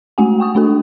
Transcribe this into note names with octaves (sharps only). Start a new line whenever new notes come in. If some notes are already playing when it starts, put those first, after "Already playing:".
G#3 A3 C#4 F#4 F#5 G#5
G5 C#6 D#6
A3 D4 F#4 A4